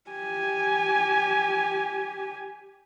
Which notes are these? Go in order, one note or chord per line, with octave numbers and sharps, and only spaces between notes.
G4 G#5